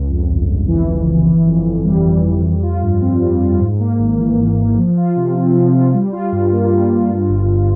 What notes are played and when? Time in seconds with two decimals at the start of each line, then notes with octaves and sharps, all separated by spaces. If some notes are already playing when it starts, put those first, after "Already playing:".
Already playing: C#2
0.09 F2
0.29 G1
0.49 G1
0.68 E3
0.88 F2
1.07 G1
1.27 E3
1.46 F2
1.66 F2
1.85 G3
2.04 E3
2.24 F2
2.43 G3
2.63 F4
2.83 G2
3.01 C4
3.21 G3
3.41 F4
3.60 G#2
3.79 A#3
3.99 G#1
4.18 E3
4.38 G#2
4.58 A#3
4.76 F3
4.97 F4
5.16 C3
5.35 C4
5.54 F3
5.75 F4
5.93 G3
6.12 F4
6.32 G2
6.52 A#3
6.71 G3
6.90 F4
7.09 G2
7.29 G1
7.49 G1